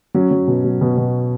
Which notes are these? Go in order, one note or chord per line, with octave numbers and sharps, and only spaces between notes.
F#3 C#4
F#3
B2
F#3
B2
B2